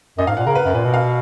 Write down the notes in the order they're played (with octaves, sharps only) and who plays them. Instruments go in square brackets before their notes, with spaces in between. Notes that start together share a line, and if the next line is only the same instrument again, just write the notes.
[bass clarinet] F#2 [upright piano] D#5
[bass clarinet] G#2 [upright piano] F5
[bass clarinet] A#2 [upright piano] F#5
[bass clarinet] C#3 [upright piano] A#4
[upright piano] B4
[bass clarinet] F#2
[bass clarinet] A#2 [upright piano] B4
[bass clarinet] B2
[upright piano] F5